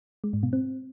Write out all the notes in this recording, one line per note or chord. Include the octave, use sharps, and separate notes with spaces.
G#3
G#2
B2
C4